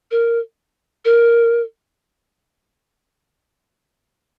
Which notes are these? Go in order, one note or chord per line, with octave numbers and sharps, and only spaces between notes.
A#4
A#4